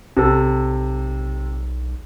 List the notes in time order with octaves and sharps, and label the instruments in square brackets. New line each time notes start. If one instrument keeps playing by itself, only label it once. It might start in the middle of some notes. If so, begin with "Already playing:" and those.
[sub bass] B1 [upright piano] C3 A4